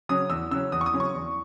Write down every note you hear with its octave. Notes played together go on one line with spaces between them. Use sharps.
C#3 F#3 C#4 D#6
E2 E6
C#3 F#3 C#4 E6
E2 D#6
C#6
D#6
C#3 F#3 C#4
C#6
E2